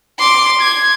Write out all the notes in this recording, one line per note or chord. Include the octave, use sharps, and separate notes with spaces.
C6 D6
G#6